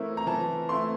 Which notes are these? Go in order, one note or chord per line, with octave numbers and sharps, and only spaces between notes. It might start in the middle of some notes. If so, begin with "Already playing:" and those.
Already playing: E3 A3 C4 E4 A#4
A#5
E3 A5
A3 C4 E4 C6